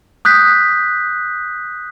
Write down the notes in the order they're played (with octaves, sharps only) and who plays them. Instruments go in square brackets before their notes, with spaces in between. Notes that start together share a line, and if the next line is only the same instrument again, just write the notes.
[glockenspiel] D#6 F#6 G6 B6